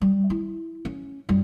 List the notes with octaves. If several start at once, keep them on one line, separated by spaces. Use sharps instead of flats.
G3
E4
C#4
F#2 G3